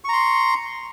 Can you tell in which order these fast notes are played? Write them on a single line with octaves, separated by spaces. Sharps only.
C#6 A#5 C6